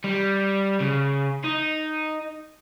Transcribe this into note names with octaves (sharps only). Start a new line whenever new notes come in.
G3
C#3
D#4